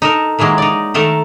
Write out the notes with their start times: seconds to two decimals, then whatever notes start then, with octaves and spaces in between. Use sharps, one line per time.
0.02 D#4 A4 A#4
0.39 D#3 E3 F#3 G#3 A#3
0.58 D#4 D5
0.94 D#3 A3 A4 A#4